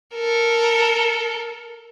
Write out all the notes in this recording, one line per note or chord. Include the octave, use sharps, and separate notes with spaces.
A4 A#4